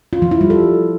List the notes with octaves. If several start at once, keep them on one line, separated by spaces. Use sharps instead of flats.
F4
F3
E4
G3
A4